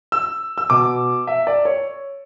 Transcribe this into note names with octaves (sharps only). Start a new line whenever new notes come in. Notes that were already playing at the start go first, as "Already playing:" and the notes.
E6
E6
B2 D6
E5
D5
C#5